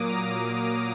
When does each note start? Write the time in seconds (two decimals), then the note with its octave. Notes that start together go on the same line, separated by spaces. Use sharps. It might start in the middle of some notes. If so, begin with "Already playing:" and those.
Already playing: A#2 F#3 A#3 D6 D#6
0.09 A#5